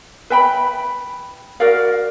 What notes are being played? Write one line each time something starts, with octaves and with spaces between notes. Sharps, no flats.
B4 E5 G5 B5
F#4 A#4 D5 F5